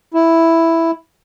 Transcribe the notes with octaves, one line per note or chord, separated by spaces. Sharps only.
E4